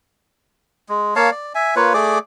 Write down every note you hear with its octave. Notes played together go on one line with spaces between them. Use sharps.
G#3
A#3 C#5 F5 A5
D5
E5 G#5
A#3 F4 B4 C#5
A3 G#4 D5 D6